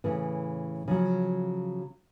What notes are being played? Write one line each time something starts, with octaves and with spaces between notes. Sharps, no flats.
A2 C#3 E3
C#3 F3 F#3